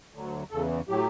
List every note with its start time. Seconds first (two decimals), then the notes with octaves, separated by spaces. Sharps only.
0.14 D2 D3 F#3
0.51 E2 C#3 E3 A4
0.89 A2 F#3 G4